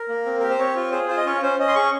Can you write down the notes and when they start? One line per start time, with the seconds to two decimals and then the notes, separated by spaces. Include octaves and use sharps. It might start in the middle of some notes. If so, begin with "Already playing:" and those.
Already playing: A#4
0.09 A#3
0.25 C4
0.40 G4 A#4
0.50 C5
0.59 C4 C#5
0.76 F4
0.92 G#4 C5
1.08 F4 C5
1.17 D#5
1.26 C#4 C#5
1.42 C#4 C5
1.59 C#4 D#5
1.68 C6
1.75 G#4 C#6